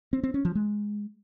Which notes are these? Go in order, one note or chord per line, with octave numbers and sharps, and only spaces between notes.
C4
C4
C#4
F3
G#3